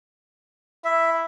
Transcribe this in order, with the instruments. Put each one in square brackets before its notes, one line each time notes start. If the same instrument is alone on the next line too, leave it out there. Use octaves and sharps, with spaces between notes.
[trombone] E4 [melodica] E5